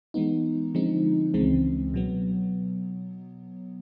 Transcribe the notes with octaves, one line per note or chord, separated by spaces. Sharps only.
E3 G#3 B3 D#4
D3 F3 G#3 C4 D#4
C#2 C#3 E3 G#3 C4
B2 F#3 B3